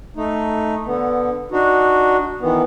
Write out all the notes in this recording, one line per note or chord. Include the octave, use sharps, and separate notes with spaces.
A3 D#4
D3 B3
D4 D#4 F#4
D#3 E3 B3